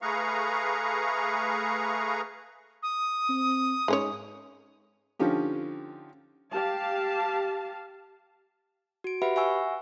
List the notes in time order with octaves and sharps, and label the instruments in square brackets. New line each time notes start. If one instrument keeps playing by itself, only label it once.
[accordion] A3 G#4 B4 F5 A#5 C#6
[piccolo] D#6
[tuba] C4
[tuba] G#2 [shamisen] G#3 C#4 C#5
[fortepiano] D3 F3 C#4 D#4 G4
[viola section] G4 F5 A5
[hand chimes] F#4 D7
G4 B4 E5 F#5 B5
E5 F#5 G#5 C#6 E6